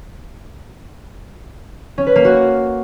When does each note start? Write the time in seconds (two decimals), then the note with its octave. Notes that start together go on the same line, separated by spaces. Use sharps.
1.98 C#4
2.07 B4
2.16 A#3
2.25 F#4